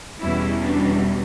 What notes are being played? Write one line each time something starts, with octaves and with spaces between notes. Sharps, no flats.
E2 B2 G3 C#4 E4
D4